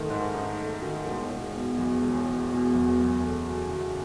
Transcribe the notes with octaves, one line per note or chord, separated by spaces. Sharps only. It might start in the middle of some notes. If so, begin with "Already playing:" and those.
Already playing: G#2 D#3 A3 D#4
G#2
D#4
A3
D#3
E1
E1
B2
E2
E1
E1
B2
E2
F#2
A3
F#3
C#3